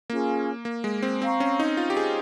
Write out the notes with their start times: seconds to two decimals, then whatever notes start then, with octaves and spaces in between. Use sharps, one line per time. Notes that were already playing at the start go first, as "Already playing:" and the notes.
0.09 A#3 C#4 F4 G#4
0.65 A#3
0.84 G#3
1.02 C4
1.21 C4 C5 F5 A#5 C#6
1.40 C#4
1.60 D#4
1.77 F4
1.90 G4
1.97 G#4